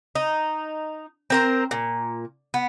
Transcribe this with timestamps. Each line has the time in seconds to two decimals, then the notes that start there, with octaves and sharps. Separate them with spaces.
0.15 D#4
1.30 C4 A#4 C5
1.71 A#2
2.54 B3